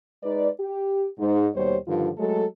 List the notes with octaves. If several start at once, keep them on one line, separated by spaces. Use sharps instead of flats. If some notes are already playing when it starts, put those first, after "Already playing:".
G#3 D#4 B4 D5
G4
G#2
D#2 B2 G3 C5 C#5
G2 D3 D#3 F3 F4
F#3 G#3 A3 A4